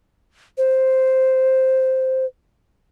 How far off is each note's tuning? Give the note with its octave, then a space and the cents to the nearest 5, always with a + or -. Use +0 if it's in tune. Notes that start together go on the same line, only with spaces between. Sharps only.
C5 +0